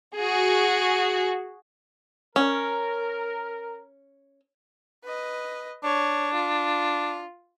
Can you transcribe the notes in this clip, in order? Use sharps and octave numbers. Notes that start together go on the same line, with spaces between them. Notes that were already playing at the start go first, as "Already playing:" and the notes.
F#4 G#4
C#4 A#4
B4 D#5
D4 C#5
F4